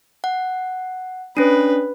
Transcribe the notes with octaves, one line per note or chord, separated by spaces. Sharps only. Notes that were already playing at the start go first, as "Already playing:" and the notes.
F#5
C#4 D4 B4